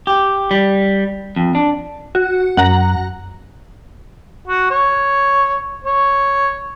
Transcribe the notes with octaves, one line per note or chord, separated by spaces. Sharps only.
G4
G3
F2
D4
F#4
F#2 F#5 A#5
F#4
C#5
C#5